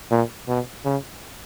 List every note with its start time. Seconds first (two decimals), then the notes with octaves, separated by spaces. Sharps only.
0.11 A#2
0.48 B2
0.85 C#3